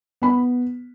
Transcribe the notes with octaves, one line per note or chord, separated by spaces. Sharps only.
B3 B5